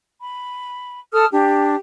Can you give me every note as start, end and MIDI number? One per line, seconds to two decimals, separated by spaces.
0.21 0.98 83
1.13 1.25 69
1.13 1.25 81
1.13 1.25 87
1.13 1.25 89
1.32 1.75 62
1.32 1.75 67